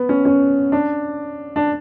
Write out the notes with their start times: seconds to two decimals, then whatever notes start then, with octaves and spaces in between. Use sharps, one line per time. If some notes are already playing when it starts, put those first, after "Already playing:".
Already playing: B3
0.09 C#4
0.25 C#4
0.72 D4
1.56 D4